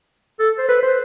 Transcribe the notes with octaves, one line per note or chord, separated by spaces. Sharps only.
A4
C5
B4
C5